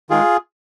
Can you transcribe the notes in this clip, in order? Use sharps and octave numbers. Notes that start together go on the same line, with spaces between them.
D#3 G#3 F4 G#4